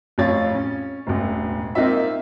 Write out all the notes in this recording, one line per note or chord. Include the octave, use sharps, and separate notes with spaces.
A1 F2 F4 C#5 F5 A6
C#4
E1 A1
A#3 C4 D#4 F4 E5